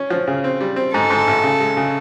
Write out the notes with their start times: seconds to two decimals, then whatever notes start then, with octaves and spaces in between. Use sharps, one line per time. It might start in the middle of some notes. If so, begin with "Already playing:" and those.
Already playing: C#4
0.10 F3
0.28 C#3
0.44 C4
0.61 G3
0.76 C4
0.93 G#2 A4
1.10 G#2
1.27 A1
1.44 C#3
1.60 G#3
1.77 C#3